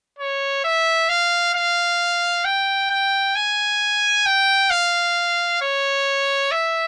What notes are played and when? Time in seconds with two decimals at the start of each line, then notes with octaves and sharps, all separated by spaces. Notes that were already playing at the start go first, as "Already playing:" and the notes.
0.19 C#5
0.64 E5
1.09 F5
1.54 F5
2.44 G5
2.90 G5
3.35 G#5
4.26 G5
4.70 F5
5.62 C#5
6.51 E5